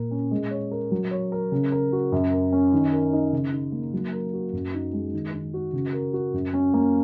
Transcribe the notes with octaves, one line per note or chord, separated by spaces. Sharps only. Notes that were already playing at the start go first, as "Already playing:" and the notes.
Already playing: A#2 A#4
C#4
G#3
C#5
A#4
F#3
C#5
A#4
C#3
A#4
F#4
F#2
A#4
C#4
D#3
A#4
D#4
C#3
D#4
A#3
F#3
A#4
F#4
F#2
D#4
G#3
D#3
D#3
F#4
C#3
A#4
F#4
F#2
C#4
A#3